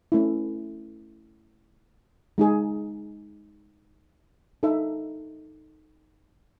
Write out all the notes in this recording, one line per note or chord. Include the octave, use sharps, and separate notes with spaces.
A3 C#4 E4
G#3 D#4 G#4
D#4 A4 E5